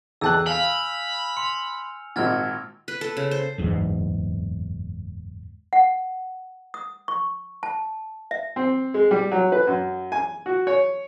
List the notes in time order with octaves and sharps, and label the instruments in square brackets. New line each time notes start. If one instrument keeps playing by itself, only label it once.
[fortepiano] E2 A5 F#6 [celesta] G#4 A4 G5 [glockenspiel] E6 G6
[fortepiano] F5 [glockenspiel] G#5 F6 F7 [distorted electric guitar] B5 [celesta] E6
[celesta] C6 F7 [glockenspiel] C#7
[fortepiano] G#1 A#2 [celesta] F#5 [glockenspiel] F6 G#6 A6
[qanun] B4
A4
C#3
C5
[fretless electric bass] F#1 E2 G#2
[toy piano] F#5
D#6
C#6
A5
E5
[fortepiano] C4
G#3
G3
F#3
B4
F#2
G#5
F#4
C#5